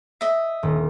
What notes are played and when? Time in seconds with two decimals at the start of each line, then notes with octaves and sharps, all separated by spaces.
0.21 D#5 E5
0.63 D#1